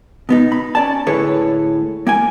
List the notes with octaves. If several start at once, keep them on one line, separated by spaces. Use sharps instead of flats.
B2 B3 D#4
B5
C#4 D5 A5
A2 D3 G#4 B4 C#5
A#3 G5 G#5